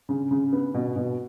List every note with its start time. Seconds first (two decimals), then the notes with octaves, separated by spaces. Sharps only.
0.09 C#3
0.31 C#3
0.53 B3
0.74 B2
0.96 B2